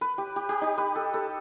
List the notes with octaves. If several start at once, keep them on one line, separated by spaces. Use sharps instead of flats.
B4
G4
G4
G4
D#4
B4
A4
A4